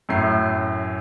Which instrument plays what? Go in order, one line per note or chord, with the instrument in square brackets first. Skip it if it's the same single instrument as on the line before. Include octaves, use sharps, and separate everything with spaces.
[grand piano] F#2 A2 C7